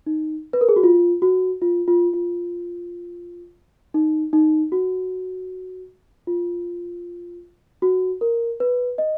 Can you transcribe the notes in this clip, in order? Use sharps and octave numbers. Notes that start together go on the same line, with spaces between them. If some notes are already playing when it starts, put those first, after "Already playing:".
D#4
B4
A#4
G#4
F#4
F4
F#4
F4
F4
F4
D#4
D#4
F#4
F4
F#4
A#4
B4
D#5